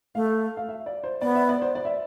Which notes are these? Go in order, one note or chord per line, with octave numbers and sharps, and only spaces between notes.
A3 F5
F5
E5
D5
C5
B3 D5
E5
D5
C5
D5
E5